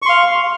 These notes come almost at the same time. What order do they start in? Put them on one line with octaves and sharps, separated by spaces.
C#6 C6 F5